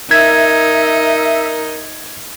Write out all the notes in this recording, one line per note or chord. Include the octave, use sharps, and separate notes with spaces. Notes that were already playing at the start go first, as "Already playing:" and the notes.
D#4 A#4 E5 G#6